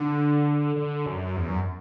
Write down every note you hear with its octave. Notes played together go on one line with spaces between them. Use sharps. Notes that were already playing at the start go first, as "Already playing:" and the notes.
Already playing: D3
D3
F#2
E2
F#2